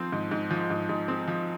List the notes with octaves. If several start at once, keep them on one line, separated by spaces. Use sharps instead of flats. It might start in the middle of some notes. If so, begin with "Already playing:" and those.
Already playing: F3 C4 C5
G#2
G#2
F3
G#2
G#2
C4
F3